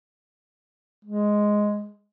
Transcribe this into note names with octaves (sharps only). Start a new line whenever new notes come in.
G#3